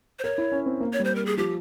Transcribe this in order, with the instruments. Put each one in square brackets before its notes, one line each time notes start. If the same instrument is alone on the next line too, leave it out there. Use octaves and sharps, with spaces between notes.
[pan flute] C5
[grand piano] A#4 [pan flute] C#5
[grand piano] E4
C#4
C4
A#3
[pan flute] C#5
[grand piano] G3 [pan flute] C5
[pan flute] A#4
G#4
[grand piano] F3 [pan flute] G4